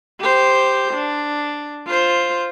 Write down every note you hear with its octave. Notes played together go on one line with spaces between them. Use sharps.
G4 C5
D4
F4 C5